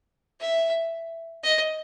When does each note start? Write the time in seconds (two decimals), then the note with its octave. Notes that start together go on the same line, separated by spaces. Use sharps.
0.40 E5
1.44 D#5